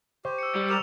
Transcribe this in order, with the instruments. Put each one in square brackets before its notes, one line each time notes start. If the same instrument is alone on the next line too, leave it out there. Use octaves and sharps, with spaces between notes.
[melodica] G4 [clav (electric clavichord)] C5 [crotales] C#6
[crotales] E6 C#7
[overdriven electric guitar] G3
[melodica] G4 A#4 D5 [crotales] E6 E7 F7